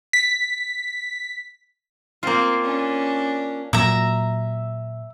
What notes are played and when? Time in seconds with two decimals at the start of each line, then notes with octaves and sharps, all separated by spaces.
0.13 B6
2.23 A#3 C4 F4
2.64 C#4 D4
3.73 A#2 F#3 E5 A#5